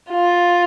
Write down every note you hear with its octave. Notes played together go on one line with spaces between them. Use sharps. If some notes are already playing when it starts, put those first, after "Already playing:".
F4